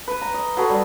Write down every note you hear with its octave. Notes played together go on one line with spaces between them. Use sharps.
B4
A#5
D#5
F#4 G#4 A4 B4
G3